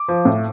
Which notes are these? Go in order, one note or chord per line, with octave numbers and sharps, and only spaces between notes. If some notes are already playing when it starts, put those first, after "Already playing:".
Already playing: D6
F3
A2